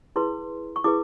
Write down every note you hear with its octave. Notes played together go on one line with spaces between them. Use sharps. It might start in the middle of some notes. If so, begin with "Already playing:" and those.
E4 G#4 B4 C6
C#6
E4 G#4 B4 D6